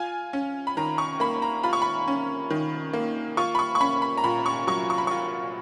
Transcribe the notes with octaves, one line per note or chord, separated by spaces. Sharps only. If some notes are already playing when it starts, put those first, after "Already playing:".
Already playing: F4 G#5
C#4
B5
D#3 A#5
C#6
A#3 B5
A#5
F4 B5
C#6
B5
C#4
D#3
A#3
F4 C#6
B5
C#6
C#6
C#4 B5
B5
A#5
A#2 B5
C#6
F#3 C#6
C#6
B5
F4 C#6